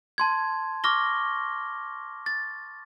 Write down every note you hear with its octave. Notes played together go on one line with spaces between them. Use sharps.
A5 C6 G#6
C#6 D6 F6 A#6 G7
A6